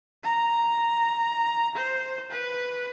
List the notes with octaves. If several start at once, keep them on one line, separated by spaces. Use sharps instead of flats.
A#5
C5
B4